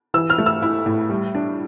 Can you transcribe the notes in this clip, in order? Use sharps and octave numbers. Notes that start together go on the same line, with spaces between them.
E3 E6
F6
A3
E6
E4
A2
G3
D4